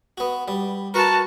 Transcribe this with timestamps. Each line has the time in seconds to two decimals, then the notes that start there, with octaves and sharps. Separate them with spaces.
0.18 B3 F#4
0.48 G3
0.94 F#4 A#4 B4 A5 A#5